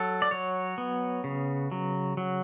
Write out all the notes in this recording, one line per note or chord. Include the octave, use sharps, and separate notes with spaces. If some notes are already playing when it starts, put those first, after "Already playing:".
Already playing: F#3 A4
D5
F#3 C#5
B3
C#3
F#3
F#3